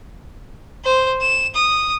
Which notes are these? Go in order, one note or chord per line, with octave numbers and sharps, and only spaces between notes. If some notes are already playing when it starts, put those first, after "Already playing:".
C5
E7
D#6